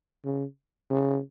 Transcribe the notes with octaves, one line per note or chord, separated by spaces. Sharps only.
C#3
C#3